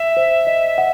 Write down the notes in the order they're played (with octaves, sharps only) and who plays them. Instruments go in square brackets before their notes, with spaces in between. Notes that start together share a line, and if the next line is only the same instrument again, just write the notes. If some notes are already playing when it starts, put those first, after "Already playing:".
Already playing: [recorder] E5
[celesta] C5
D#5
F#5